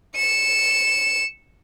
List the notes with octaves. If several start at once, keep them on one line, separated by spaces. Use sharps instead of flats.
C#7 E7